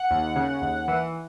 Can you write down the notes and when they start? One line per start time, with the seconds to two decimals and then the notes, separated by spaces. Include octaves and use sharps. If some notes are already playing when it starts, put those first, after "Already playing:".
Already playing: F#5
0.11 D#2
0.36 C#3
0.62 D#2
0.88 E3